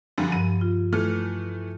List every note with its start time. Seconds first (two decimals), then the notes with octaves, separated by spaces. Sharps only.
0.18 F#2 D3 F3 G3
0.32 G2 D#7
0.61 F4
0.92 E3 A3 F6